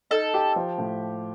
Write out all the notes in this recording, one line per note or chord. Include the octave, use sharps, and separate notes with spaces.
D#4 A4
G4
F3
A2